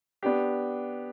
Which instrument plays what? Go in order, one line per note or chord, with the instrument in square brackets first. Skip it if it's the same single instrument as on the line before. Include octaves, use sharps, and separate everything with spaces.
[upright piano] B3 D4 G4